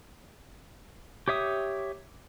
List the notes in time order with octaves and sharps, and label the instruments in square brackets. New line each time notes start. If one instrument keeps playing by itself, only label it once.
[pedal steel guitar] G4 C#5 E5 D#6